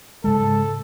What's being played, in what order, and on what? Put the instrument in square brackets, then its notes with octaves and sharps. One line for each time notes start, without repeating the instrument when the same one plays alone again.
[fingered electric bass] G#2 C#3 G#3 [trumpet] A4